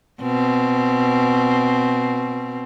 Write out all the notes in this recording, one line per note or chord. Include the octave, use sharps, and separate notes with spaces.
B2 C4